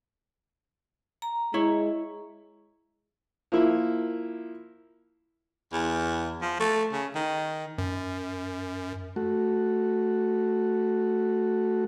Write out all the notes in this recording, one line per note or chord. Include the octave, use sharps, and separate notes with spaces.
A#5
G#3 E4 C#5
F3 A#3 E4
E2
F3
A3
C#3
D#3
F#2
A3 F#4